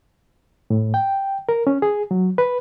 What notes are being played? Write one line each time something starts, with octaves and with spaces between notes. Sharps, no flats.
A2
G5
A#4
C#4
G#4
F#3
B4